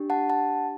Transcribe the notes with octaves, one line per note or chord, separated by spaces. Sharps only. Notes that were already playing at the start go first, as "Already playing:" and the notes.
Already playing: D4 G4
F#5 A5
F#5 A5